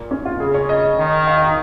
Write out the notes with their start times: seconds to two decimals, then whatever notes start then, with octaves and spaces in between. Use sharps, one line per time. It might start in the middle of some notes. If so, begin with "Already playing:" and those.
Already playing: A#2 A#3
0.11 C#4
0.25 F4
0.40 C#3 G#4
0.54 C#5
0.69 D#5
0.98 D#3
1.27 F5
1.37 D#5
1.46 D#4